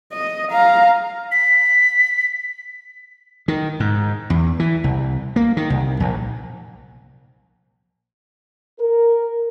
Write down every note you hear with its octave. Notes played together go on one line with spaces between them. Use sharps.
D#5
F5 A#5
B6
D#3
G#2
E2
E3
C2
A#3
D#3
C2
A#1
A#4